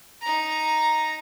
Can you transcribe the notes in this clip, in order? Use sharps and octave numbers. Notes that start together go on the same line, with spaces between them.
D#4 A#5